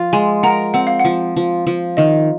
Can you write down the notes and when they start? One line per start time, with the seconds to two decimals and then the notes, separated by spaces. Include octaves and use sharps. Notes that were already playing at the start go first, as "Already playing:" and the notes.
Already playing: F3 F4
0.13 G#3 G#5 C6
0.43 A#4 F#5 A#5
0.74 C4 F#5
0.87 F5
1.00 F#5
1.05 F3
1.36 F3
1.67 F3
1.97 D#3 D#5